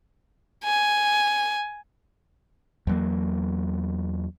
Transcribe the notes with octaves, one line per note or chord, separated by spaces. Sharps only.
G#5
E2 F#3 A#3